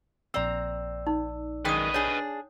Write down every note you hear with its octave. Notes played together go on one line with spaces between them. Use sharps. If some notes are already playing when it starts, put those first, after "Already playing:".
A#1 C4 D5 A#5 E6
D#4
F#2 D#3 G#3 B4 D#5 G5 D#6
D4 G#4 C#5